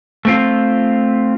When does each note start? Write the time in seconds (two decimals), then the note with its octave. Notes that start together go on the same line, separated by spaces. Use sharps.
0.25 A3 C4 F4